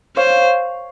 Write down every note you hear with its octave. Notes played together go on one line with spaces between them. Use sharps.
C5 C#5 F5